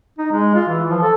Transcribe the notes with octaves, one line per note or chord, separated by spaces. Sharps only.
D#4
G#3
F4
E3
F3
A4